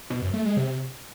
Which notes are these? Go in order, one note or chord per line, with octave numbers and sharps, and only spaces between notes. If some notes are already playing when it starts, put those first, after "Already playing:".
B2
F#2
A3
G#3
C3